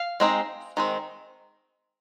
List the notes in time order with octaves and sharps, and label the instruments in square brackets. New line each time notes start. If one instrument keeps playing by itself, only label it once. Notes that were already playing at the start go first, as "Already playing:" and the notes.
Already playing: [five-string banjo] F5
G#3 C4 D#4
D#3 G#3 C4